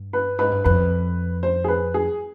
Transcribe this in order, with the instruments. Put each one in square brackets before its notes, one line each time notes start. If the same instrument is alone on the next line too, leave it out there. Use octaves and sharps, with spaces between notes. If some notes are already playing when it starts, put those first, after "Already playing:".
Already playing: [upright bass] G2
[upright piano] B4
[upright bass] G#2 [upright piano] B4
[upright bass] G2
[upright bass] F2 [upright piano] B4
[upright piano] C5
G#4
B4
G#4